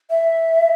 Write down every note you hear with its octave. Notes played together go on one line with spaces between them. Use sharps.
E5